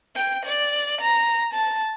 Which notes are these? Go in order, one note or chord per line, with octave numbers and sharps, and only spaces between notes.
G5
D5
A#5
A5